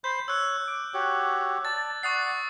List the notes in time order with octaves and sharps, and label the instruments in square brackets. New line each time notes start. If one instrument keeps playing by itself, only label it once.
[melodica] C5 B5 C6 [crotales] G6
[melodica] C#5 [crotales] E6 F#6
[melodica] D6
F#4 G4 C#5
[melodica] D5 A5 [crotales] A6
[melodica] D5 F#5 [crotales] C#6 D#6 C7